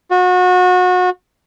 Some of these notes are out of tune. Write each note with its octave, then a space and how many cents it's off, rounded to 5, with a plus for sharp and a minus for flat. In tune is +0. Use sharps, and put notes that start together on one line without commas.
F#4 -30